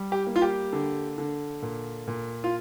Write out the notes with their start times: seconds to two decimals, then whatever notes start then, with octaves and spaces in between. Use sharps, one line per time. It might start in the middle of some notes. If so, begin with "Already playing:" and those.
Already playing: G3
0.12 G4
0.27 A#3
0.36 F4
0.42 G4
0.73 D3
1.18 D3
1.62 A#2
2.08 A#2
2.44 F4